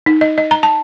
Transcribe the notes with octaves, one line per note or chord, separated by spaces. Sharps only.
D#4
D#5
D#5
A#5
A5